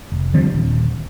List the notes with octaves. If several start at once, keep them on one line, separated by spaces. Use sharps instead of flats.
F1
D3 F3 G3 C4
D#1